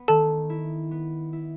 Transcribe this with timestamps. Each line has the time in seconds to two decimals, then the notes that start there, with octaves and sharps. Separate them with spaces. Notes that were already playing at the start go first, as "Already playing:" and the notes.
Already playing: B3
0.08 D#3 A4 A5
0.50 E4
0.91 B3
1.33 E4